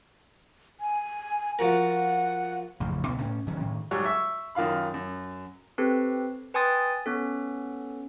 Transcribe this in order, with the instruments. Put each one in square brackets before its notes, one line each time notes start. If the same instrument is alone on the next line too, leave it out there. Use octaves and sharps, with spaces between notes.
[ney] G#5
[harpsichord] F3 F#4 A#4 [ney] F#5
[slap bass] A1 F2 C#3
C#2 B2 A3 B3
A2 C#4
G2 D#3 F#3 C#4
A2 D#3
[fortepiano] G#2 F#3 G3 C#6
E5 C#6 E6
F#2 D#3 F4 F5 B5
F#2
[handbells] C4 G4 A4 B4
B4 G5 G#5 C6 D#6 A6
B3 C#4 A4